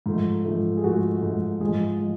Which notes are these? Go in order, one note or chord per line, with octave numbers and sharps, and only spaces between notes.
G#2 F3 A3
G#2 F3 A3
G#4
G#2 F3 A3 F#4
G#2 F3 A3
G#2 F3 G#3 G#4
F3 G#3